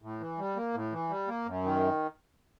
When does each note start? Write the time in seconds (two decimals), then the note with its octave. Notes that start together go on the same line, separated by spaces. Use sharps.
0.02 A2
0.20 E3
0.38 G3
0.56 A#3
0.74 A2
0.92 E3
1.10 G3
1.27 A#3
1.45 F#2
1.63 D#3